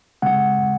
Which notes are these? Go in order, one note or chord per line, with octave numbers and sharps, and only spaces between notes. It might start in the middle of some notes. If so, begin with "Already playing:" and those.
C#3 G#3 C4 F#5